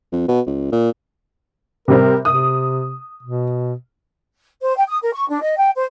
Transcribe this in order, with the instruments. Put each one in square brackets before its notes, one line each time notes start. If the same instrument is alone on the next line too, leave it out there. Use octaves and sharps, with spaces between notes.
[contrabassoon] F2
B2
C#2
A#2
[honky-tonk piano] C3 G3 C4 [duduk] A#4
[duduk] C3 [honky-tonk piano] D#6
[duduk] B2
[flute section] C5
G5
D#6
A#4
C#6
D4
D#5
G5
C5